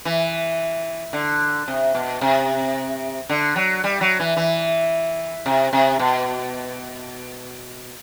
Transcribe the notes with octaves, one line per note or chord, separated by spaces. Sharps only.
E3
D3
C3
B2
C3
D3
F#3
G3
F#3
E3
E3
C3
C3
B2